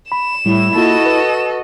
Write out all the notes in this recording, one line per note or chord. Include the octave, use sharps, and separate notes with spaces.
B5 E7
A2 G3 E4
A#3 F4 F#4 A4 D#5
B4